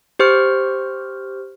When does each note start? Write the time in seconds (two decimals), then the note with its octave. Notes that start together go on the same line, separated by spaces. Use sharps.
0.19 G4 C5 C#6 F6